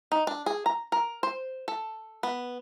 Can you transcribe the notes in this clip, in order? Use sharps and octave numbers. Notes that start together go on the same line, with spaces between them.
D#4
D4
G#4
A#5
A#4
C5
A4
B3